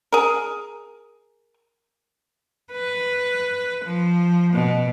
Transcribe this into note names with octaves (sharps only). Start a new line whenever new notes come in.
G#4 A#4
B4
F3
B2